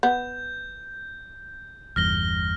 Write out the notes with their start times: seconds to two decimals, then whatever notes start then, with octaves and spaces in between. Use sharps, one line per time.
0.03 B3 G6
1.96 G1 E2 G2 F6 A#6 G7